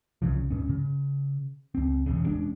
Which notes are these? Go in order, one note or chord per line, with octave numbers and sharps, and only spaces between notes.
C2 C#3 F3
D1 G#2 C#4
C#3
C#2 C4
E1 A1 C#3
E1 G#3 C#4 D4